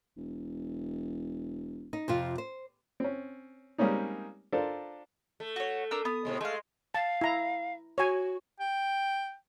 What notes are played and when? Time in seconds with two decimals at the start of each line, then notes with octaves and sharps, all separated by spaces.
0.17 E1
1.93 D#4
2.08 F2 C3 F4
2.38 C5
3.00 C4 C#4
3.78 G3 G#3 A#3 C4 C#4 D#4
4.52 D4 F4 A4 A#4 C5
5.40 A3
5.56 F#4 C#5
5.91 D4 A#4 E6
6.05 B3 D#6
6.25 A2 C3 G#3
6.41 G#3 A3 F5
6.94 F5 A5
7.21 E4 A#5
7.98 F#4 C#5 G#5
8.60 G5